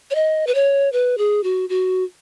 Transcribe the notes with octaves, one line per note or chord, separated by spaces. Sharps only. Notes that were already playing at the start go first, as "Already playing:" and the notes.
C#5
D#5
B4
C#5
B4
G#4
F#4
F#4